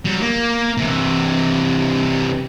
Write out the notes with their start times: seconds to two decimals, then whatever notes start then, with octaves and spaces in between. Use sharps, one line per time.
0.05 F#3 G3
0.21 A#3
0.77 C3 E3